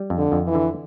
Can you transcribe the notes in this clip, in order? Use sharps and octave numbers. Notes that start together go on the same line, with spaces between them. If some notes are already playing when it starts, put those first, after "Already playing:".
Already playing: G3
F2
D3
F2
E3
D3